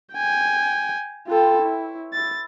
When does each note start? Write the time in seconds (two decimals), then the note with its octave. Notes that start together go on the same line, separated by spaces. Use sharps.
0.14 G5 G#5
1.27 C4 F4 A4 B4 C5
1.62 E4 C#5 E5
2.13 E4 A6